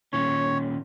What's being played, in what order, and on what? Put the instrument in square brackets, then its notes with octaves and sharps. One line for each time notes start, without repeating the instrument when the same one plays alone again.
[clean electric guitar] A#2 D#3 C#4 [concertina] C#5